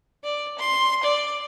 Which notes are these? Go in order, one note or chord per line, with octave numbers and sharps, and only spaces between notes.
D5
C6
D5